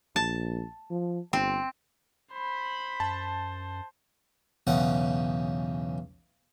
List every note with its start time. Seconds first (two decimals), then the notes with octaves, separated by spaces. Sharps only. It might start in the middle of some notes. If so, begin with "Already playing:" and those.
0.16 A#1 A5
0.91 F3
1.33 G1 C4
2.33 C5 B5
3.00 F#2 A5
4.67 B1 E2 C#3 F#5